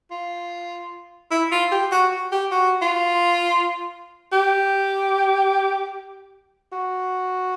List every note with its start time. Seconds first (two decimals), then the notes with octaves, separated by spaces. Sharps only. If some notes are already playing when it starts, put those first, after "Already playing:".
0.11 F4
1.31 E4
1.51 F4
1.71 G4
1.92 F#4
2.12 F#4
2.32 G4
2.52 F#4
2.82 F4
4.32 G4
6.73 F#4